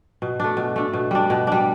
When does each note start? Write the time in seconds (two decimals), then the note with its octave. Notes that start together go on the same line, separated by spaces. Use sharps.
0.22 B2
0.40 A3 D4
0.57 B2
0.76 A3 D4
0.93 B2
1.11 G3 D4
1.30 B2
1.47 G3 D4